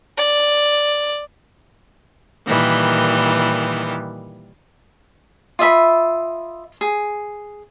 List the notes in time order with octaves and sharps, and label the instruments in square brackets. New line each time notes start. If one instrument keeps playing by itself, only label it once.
[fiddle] D5
[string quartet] A#2 D#3 E3 G3
[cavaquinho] F4 D#5 E5 B5
G#4